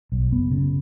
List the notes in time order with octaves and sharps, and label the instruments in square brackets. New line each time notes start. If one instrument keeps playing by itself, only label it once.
[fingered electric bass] B1
F#1 B3
C#3